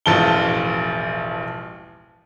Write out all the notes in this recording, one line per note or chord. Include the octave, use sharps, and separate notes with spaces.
E1 A1 F3 A5 G7